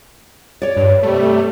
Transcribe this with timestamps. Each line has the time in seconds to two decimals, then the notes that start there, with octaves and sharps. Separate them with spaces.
0.62 C#5 D5
0.76 G2
1.03 C3 G3 A3